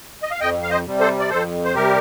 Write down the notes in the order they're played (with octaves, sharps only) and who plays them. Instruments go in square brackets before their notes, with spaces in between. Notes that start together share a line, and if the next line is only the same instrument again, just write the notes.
[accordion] D#5
F5
F2 D#5 G5
F5
C5 D#5
C3 G3
A4 C5
D5
F2 A4 C5
C5
C3 G3 G4 A#4